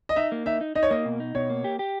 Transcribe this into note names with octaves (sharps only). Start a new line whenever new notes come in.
D#5
D#4 E5
A#3
D#4 E5
D#4
D#4 D#5
C#5
A#3 D#5
B2
D#4
B2 C#5
A#3
G4
G4